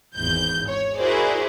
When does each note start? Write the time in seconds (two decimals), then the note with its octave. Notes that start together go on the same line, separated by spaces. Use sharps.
0.17 G#1 E2 G6
0.69 C#5
0.99 E4 F#4 G#4 A#4 C5 D5